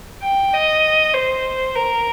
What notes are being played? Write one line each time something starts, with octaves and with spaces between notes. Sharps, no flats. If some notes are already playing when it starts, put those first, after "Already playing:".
G5
D#5
C5
A#4